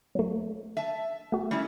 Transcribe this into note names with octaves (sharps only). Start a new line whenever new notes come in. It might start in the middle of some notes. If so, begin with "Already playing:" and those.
F#3 A3
E5 A5
A3 F#4
G3 C#4 E4